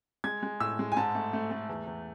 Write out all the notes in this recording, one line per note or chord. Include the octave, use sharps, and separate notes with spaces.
G#3 G#6
G#3
A2 E6
G#3
G#5
G#2 A5
A3
A3
A3
E2
E2